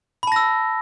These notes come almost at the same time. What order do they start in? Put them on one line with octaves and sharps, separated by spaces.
B5 A5 A#6 E6